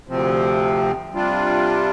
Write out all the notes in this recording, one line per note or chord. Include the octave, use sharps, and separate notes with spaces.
D2 C3 F3 C4
C3 G3 D4 F4